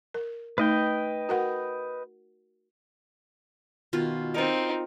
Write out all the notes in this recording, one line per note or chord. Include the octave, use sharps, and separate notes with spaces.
A#4
A3 D#4 B4 D#5 G5
F#4 A#4 F#5
B2 D#3 F4
C4 D#4 F4 A#4